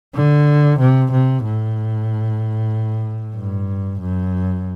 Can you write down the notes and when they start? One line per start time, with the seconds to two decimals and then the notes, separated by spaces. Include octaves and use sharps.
0.15 D3
0.79 C3
1.12 C3
1.44 A2
3.36 G2
4.01 F#2